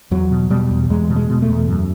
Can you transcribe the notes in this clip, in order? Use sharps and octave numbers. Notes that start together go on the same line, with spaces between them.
E2 F#3
B2
B2 G3
E2
E2 G#3
B2
G#3
B2
A3
E2
F#2